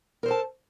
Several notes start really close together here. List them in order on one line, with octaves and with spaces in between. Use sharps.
A#4 C5 A4 A5